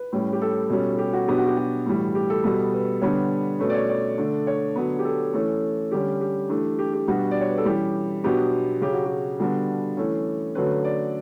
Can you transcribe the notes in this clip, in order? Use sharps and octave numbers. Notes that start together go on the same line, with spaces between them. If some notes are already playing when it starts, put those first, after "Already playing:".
Already playing: B4
A2 G3 C#4
G4
A4
B2 G3 C#4
A4
G4
F#4
B2 F#3 B3 D4 G4
F#4
G4
F#4
A2 E3 G3
G4
A4
B2 G3 B3
B4
D3 G3 B3 D4 C#5
B2 A3 C#4 B4
D5
C#5
D5
D3 A3 D4
C#5
D3 F#3 B3
G4
A4
E3 A3 C#4 A4
D3 G3 C#4 G4
G4
E3 A3 D4
G4
G4
B2 G3 B3 D4 F#4
D5
C#5
B4
A4
E3 G3 C#4 G4
B2 F#3 B3 D4 G4
C#3 F#3 C#4 G4
F#4
G4
D3 G3 B3 D4 F#4
E3 A3 C#4
D3 F#3 A3 C#4 B4
D5